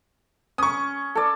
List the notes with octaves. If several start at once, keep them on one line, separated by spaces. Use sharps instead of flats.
C#4 C#6 D#6
A4 D5